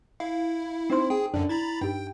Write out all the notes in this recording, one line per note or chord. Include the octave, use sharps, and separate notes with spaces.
E4 F5
C4 D#4 C5 C6
G#4 G5
F#2 D3 D4 D5
E4 A#5 B5 A6
G2 D#4 G4 G5